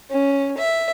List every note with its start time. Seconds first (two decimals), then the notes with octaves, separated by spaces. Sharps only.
0.11 C#4
0.58 E5